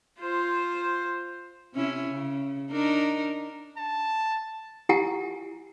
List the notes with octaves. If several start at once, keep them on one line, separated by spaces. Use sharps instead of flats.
F4 C5
C3 C#4 E4
C#3
D4 D#4 A#4
A5
E4 F4 G4 F#5 G#5 A#5